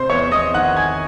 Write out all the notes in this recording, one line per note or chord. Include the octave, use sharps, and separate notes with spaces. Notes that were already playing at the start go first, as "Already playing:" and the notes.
Already playing: C3 C5 C6
E2 C#5 C#6
E2 D#5 D#6
D#3 F#5 F#6
D#3 G#5 G#6